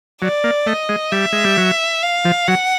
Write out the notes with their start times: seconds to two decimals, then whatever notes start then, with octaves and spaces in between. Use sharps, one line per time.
0.22 F#3 D5
0.44 A#3
0.66 A3 D#5
0.89 G#3
1.11 G3 E5
1.33 G#3
1.44 G3
1.58 F#3
2.03 F5
2.25 F3
2.48 F#3 F#5